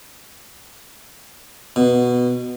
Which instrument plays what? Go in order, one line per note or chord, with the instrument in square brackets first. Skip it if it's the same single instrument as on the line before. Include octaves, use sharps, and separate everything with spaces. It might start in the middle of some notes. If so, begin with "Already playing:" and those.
[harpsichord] B2